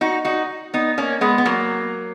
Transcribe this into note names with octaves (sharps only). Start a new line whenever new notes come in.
D#4 F#4
D#4 F#4
B3 D#4
A#3 C#4
G#3 B3
B3
F#3 A#3